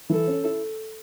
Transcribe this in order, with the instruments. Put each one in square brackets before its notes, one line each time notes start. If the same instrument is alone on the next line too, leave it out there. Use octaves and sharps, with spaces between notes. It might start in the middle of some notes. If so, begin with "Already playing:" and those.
[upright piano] E3 [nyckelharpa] A4
[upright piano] C#4
E4